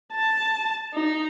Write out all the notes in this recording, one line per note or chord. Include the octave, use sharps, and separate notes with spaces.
A5
D#4